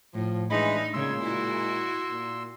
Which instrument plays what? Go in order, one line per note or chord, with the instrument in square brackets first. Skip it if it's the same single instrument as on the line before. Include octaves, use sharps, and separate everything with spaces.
[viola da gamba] A2 [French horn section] F3
[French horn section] E3 D4 [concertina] G#3 B5 [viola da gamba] D#4
[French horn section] A#2 G#3 [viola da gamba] C#3 [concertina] C6 E6
[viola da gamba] E4 F#4
[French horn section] A#2